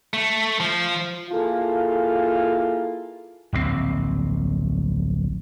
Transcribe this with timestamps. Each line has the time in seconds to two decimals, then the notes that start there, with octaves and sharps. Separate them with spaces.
0.13 A3
0.60 F3
1.31 A#3 E4 F4 G#4 A4
3.53 D1 A#1 A#2 C4